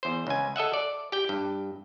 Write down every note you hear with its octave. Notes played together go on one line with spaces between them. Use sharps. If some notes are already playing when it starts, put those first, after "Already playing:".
E2 C5
C#2 G#5
A4 D#5 E5 F#5
D5
G4 G5
G2